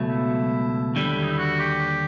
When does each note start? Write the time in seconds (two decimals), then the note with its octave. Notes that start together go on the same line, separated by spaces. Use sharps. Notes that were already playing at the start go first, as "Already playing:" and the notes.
Already playing: C#2 B2 F#3 A3
0.09 E4
0.95 D#2 D3 G3 E4
1.17 E4
1.23 D#4
1.31 E4
1.38 F#4
1.59 G4